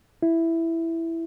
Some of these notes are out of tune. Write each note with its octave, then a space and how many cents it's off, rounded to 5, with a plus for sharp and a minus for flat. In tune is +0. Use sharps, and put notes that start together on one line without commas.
E4 +5